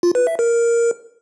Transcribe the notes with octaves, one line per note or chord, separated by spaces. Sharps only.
F4
B4
E5
A#4